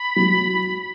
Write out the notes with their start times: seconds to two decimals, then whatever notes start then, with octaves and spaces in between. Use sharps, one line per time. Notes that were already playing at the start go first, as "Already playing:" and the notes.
Already playing: B5
0.16 F#3